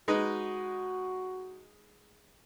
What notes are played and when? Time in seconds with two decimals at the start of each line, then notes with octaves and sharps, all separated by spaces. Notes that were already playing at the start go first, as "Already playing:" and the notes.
0.08 G#3 D#4 F#4 B4